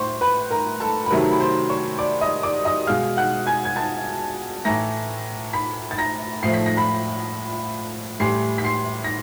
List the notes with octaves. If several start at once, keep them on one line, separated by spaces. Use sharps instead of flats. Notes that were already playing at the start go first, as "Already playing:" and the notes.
Already playing: A2 C5 C6 C#6
B4 B5
A#4 A#5
A4 A5
B5
C3 D#3 F#3 A3 A#4 A#5
A#5
B5
C5 C6
C#5 C#6
D5 D6
D#5 D#6
D5 D6
D#5 D#6
B2 G#3 F5 F6
F#5 F#6
G#5 G#6
G#6
A5 A6
A2 E3 A3 A#5 A#6
B5 B6
A6
A#5 A#6
A2 F3 A3 C7
B6
A#6
B5 B6
A2 E3 G3 C6 C7
B6
C6 C7
A#6